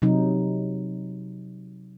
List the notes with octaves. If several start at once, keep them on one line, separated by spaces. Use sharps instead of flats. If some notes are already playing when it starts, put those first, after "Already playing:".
C3 F#3 D#4